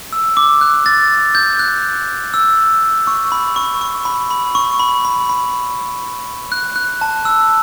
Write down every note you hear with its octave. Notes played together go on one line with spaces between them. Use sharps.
E6
D6
F#6
A6
G6
F#6
E6
C#6
B5
C#6
C#6
B5
B5
C#6
B5
B5
B5
F#6
F#6
A5
E6